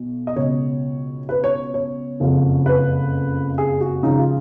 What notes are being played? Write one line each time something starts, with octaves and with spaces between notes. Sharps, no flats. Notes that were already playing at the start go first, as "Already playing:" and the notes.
Already playing: B1 B2
D#5
C#2 B2 C#5
B4
C#5
C#5
F#1 F2 C#3 F3
B4
G#4
F#4
C#2 C#3 F3 D#4
F4